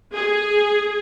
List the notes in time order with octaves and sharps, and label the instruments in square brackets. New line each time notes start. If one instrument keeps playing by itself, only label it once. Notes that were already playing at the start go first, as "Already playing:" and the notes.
[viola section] G#4